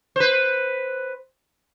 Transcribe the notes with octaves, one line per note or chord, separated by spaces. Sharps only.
B4 C5